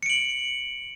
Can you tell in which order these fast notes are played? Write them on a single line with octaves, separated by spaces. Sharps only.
C#7 D7 F#7